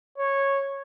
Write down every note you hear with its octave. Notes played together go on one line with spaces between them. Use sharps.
C#5